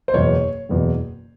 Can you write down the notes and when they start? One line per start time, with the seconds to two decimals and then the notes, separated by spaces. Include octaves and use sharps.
0.08 C5
0.13 F#1 E2 B2 C#5
0.69 F#1 E2 B2